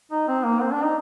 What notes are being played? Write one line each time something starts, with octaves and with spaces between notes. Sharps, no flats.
D#4
C4
A#3
C4
D4
D#4